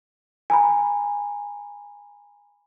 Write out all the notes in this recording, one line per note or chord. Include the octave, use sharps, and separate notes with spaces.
G#5 A#5 B5